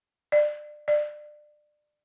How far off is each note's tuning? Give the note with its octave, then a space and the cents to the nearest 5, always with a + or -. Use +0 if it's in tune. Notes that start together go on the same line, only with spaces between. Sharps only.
D5 +25
D5 +25